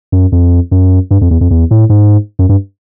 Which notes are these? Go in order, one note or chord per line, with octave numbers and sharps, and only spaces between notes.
F#2
F2
F#2
G2
F2
E2
F2
E2
A2
G#2
F#2
G2